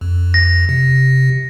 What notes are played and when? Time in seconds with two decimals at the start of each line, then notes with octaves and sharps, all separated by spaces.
0.01 F2
0.34 A#6
0.69 C3